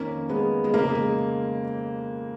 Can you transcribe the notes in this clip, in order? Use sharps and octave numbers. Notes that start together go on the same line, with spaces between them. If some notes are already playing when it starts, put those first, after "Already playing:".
Already playing: F2 D#3 A#3 C#4
G#3 B3
G#3
F2 C#3 A#3
G#3